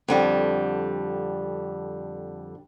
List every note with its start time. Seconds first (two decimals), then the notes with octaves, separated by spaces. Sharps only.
0.08 F2 D3 G3